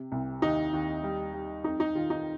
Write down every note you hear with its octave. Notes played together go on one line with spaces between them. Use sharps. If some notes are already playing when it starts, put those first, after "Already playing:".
Already playing: C3
C2
D#2 D#4
D#2
G3
G3
F2 D#4
D#4
D#3 F4
D#4